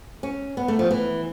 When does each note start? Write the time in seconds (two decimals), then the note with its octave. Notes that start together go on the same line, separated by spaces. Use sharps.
0.23 C#4
0.57 B3
0.68 A3
0.79 F3
0.91 E3